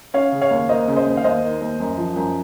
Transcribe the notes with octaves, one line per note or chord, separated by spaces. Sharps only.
C#4 C#5 F5
C#3
C#5 F5
D#2
A#3 C5 D#5
C#3
C5 D#5
D#2
F5
D#2 C5 D#5
D#3
D#2
F#2
F3
F#2